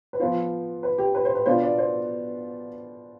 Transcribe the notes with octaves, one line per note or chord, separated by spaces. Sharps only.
B4
F3 B3 F4 C5
B4
G4
B4
C5
B4
B2 B3 D4 F4 C5
D5
C5